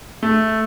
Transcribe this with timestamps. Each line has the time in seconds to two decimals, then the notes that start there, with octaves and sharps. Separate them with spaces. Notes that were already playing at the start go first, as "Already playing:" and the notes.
0.23 A3